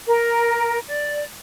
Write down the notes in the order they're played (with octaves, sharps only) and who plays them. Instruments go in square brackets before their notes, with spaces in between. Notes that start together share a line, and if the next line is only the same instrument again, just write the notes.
[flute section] A#4
D5